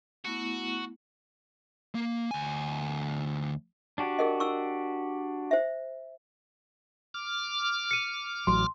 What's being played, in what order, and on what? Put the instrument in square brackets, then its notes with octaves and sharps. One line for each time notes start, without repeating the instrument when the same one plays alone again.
[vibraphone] A3 B3 E4 [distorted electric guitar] F#4
[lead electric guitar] A#3
D2 G#5
[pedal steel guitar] D4 F#4 G4
[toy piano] G#4 A#4 D#5
C#6 E6
C5 E5
[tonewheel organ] D6 F6
[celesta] C#7 D#7
[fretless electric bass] A1 F#3 [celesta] C6